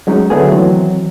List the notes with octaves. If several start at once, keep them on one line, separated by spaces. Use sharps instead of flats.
F#3 G#3 C#4 D#4
D3 F#3 A3 B3 G#4
D#3 E3 F#3 C4